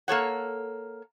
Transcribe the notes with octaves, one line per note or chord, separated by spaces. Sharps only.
A#3 A4 C#5 F#5